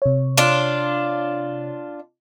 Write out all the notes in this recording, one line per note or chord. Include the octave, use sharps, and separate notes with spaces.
C3 C#5
D4 F4